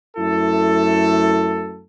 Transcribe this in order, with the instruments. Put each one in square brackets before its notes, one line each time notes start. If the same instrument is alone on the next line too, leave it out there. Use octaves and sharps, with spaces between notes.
[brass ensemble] F#2 A3 E4 A4